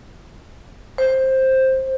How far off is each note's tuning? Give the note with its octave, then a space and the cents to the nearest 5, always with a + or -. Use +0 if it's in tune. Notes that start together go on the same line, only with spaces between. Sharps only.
C5 +10